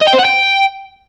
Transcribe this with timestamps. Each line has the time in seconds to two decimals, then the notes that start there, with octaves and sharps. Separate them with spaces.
0.01 D#5
0.07 G5
0.13 C5
0.19 F#5
0.24 G5